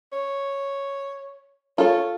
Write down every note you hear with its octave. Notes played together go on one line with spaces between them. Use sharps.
C#5
F4 A4 C#5